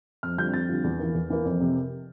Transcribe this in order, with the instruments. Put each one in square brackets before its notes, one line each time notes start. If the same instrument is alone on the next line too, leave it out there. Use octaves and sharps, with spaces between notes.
[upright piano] F2 F6
D3 G3 C4 F4 G6
F2 A6
D3 G3 C4 F4
E2
E3 A#3
E2
E3 A#3
F2
C3